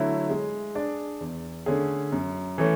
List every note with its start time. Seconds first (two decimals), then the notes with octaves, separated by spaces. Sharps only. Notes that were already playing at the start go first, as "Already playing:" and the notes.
Already playing: D3 F#3 A3 E4
0.30 G#3
0.75 D4 G#4 D5
1.20 E2
1.66 D3 A3 C#4 G#4
2.12 F#2
2.58 E3 A3 C#4